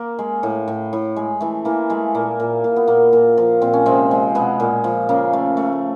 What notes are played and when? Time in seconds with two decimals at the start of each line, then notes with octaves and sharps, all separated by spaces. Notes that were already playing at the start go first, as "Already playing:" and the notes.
Already playing: A#3
0.19 G#3
0.43 A2
0.68 A2
0.93 A2
1.16 G#3
1.41 E3 A3
1.65 E3 A#3
1.90 G#3 A3
2.15 A#2 A#3
2.40 A#2
2.64 A#2
2.76 B3
2.88 A#2 A#3
3.13 A#2
3.38 F3
3.61 A#2 C4
3.73 C#4
3.86 C3 G#3 C4
4.11 G#3
4.35 B2 G#3 B3
4.60 A#2
4.84 F3
5.09 C#3 A#3
5.33 A3
5.57 A3